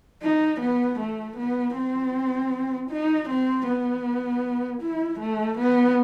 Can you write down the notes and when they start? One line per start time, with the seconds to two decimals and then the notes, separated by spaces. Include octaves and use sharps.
0.22 D#4
0.61 B3
0.99 A3
1.37 B3
1.75 C4
2.91 D#4
3.29 C4
3.67 B3
4.82 E4
5.20 A3
5.58 B3